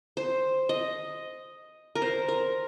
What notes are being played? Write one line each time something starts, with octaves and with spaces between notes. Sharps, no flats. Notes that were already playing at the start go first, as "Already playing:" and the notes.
C5
D#5
A#4
C5
A#4